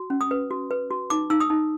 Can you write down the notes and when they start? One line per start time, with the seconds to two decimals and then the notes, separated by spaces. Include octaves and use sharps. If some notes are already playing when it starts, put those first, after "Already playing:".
Already playing: F#4
0.10 C#4
0.21 D#6
0.31 B4
0.51 F#4
0.71 B4
0.91 F#4
1.10 D#4 D6
1.30 D#4 E6
1.40 D#6
1.50 D#4